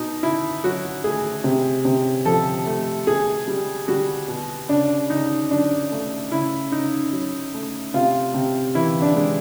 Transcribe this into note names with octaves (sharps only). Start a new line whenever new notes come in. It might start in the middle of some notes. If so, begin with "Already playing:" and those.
Already playing: B2 D#4
B2 E4
F#3 F#4
A3 G#4
C3
C3
F3 A4
A3
B2 G#4
G3
G3 F#4
B2
C#3 D4
C#3 D#4
F#3 D4
A3
C#3 E4
C#3 D#4
F#3
A3
C3 F4
C3
E3 E4
D4
G#3